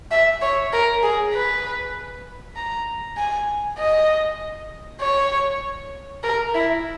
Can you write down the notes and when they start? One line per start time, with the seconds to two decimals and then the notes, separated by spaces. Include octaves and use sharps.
0.11 E5
0.42 C#5
0.73 A#4
1.03 G#4
1.34 B4
2.56 A#5
3.17 G#5
3.78 D#5
5.01 C#5
6.23 A#4
6.55 E4